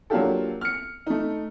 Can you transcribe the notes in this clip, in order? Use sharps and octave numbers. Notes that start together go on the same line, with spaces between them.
F#3 A#3 D4 F4 G4 A4
F6 C#7
A3 D#4